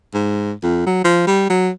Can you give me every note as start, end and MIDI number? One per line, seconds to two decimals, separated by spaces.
0.14 0.52 44
0.63 0.85 41
0.86 1.04 54
1.04 1.24 53
1.27 1.47 55
1.49 1.70 54